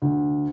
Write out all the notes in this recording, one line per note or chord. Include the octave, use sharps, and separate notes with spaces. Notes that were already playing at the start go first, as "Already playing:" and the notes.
D2